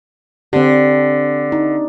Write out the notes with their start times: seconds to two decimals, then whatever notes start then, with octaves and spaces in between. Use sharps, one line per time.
0.53 D3 C4 G4
1.52 D#4